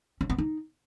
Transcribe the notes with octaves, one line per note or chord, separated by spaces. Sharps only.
C#4
B3
D#4